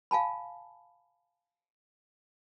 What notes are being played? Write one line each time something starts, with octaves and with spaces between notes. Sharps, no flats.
F5 G#5 A5 B5